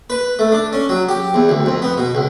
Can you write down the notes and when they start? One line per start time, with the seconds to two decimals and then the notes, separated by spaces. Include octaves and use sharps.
0.10 B4
0.39 A3
0.52 D4
0.73 C#4
0.89 F#3
1.09 G4
1.34 E2
1.49 D2
1.66 F2
1.82 B3
1.97 B2
2.15 C#2